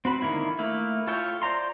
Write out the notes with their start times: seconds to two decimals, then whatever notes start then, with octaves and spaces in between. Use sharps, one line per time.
0.05 C4 F#4 B5
0.22 D3 D#3 A#3 E4
0.59 A3 A#3 E4
1.07 F4 A4 C#5 E5 G5
1.42 C5 D5 A#5 C6